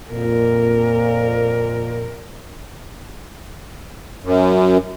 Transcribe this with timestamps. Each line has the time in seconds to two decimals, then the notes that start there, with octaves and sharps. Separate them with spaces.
0.12 F2 A#2 A#4
4.24 F#2